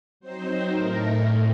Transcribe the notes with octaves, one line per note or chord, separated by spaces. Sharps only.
F#3 C4 D#4 C5
A2 A3 D#4 A#4
A2 A3 C4